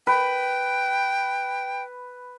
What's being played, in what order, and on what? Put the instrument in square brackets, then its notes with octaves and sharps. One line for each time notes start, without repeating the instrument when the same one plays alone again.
[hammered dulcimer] B4 [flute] G5